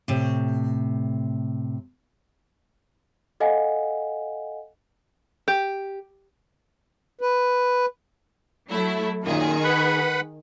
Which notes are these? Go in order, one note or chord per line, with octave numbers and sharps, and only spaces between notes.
A2 C3
A4 D#5 F5 F#5 G#5
G4
B4
F#3 A3 E4
F#2 A#2 D#3 G#4
B4 F#5 B5